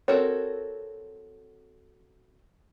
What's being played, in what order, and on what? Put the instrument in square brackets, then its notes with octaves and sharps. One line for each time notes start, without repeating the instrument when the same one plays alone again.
[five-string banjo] C4 F#4 A4 A#4 C#5